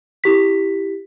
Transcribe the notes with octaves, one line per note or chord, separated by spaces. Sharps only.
E4 G4 B6